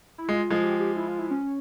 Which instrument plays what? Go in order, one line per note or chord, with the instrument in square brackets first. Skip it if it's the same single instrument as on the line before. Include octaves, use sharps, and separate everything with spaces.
[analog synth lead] E4
[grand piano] G#3 [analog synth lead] F4
[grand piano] F3 G#3
[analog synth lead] G4
G4
E4
F4
E4
C#4